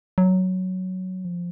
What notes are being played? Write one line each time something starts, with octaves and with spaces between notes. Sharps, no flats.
F#3
F3